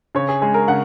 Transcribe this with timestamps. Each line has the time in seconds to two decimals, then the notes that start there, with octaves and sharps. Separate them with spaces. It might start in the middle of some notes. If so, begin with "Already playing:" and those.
0.15 C#3 C#5
0.29 G#4
0.42 G#3 G#4
0.54 A#4
0.68 C#3 F#5